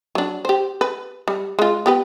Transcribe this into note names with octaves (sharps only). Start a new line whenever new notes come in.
F#3 D4
G4 C5
B4
G3
G#3 F4
B3 G4 B4